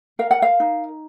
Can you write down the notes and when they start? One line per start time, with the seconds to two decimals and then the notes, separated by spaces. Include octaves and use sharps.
0.19 A#4 F5
0.31 F#5
0.42 F5
0.60 D#4